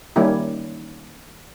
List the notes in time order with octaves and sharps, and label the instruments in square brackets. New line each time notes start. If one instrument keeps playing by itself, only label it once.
[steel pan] D#3 G3 A#3 C#4 E4